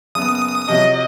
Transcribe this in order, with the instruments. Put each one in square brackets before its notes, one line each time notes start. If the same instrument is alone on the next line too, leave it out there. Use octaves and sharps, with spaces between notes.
[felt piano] F#1 B3 [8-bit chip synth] D#6
[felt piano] C3 F3 F#3 [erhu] D#5